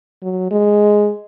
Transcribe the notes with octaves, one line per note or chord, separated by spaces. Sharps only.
F#3
G#3